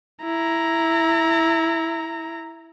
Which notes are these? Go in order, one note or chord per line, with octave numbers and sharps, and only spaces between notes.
E4 A#5